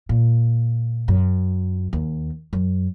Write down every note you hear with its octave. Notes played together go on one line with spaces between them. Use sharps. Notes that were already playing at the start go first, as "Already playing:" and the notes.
A#2
F#2
D#2
F#2